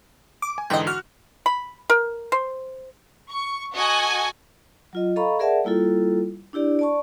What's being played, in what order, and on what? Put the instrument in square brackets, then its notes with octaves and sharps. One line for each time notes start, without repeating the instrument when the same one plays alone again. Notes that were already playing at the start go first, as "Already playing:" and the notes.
[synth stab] D6
[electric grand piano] G#5
[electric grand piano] G#2 D3 E3 [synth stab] D#5 G5
[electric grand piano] F#4 F#6 [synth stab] F6
[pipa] B5
A#4
C5
[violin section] C#6
F#4 A4 D#5 F#5 G#5
[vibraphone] F#3 F4 D#5
A4 D#5 F5 A#5 B5 C#6
G#4 A#4 D5 E5 F#5 A5
G3 A#3 E4 F4 A4
D4 E4 G4 D5
D5 A5 C#6